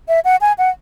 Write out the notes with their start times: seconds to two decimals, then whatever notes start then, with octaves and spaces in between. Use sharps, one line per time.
0.08 E5
0.25 F#5
0.41 G#5
0.58 F#5